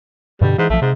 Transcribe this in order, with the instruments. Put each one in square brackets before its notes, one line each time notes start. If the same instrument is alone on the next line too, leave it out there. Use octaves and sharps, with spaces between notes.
[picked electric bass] G2 B2 D3 [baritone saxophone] G3
[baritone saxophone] G#2 [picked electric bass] E3
[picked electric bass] A#1 F3 [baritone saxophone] A3
[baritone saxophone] G#2 [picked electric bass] C3